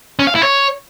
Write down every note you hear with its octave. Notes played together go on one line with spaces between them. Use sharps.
C#4
F5
E4
C#5